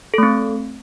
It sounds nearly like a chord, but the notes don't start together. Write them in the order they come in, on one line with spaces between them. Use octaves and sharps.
A4 A3 C4